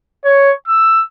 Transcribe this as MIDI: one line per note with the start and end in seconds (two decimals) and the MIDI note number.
0.25 0.52 73
0.67 1.02 88